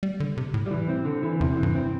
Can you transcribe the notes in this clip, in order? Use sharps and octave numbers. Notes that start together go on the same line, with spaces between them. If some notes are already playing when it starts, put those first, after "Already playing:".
G3
D3
C3
A2
G3
E3
C4
D3
E3
E2 C3
E3
G2
C4